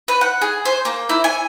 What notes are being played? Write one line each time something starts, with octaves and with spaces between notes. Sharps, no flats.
B4
F#5
G#4
C5
A#3
E4
G#5